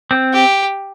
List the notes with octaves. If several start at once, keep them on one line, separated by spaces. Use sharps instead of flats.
C4
G4